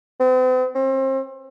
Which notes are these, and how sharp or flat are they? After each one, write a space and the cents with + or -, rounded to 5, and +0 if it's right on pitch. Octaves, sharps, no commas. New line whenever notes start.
C4 -45
C4 +35